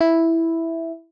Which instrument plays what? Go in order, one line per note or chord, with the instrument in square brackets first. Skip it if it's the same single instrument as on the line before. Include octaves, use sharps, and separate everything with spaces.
[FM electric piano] E4